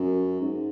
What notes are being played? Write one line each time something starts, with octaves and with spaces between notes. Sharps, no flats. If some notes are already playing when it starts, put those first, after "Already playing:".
Already playing: F#2
G#2